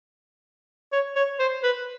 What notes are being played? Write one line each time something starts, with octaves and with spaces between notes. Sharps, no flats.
C#5
C#5
C5
B4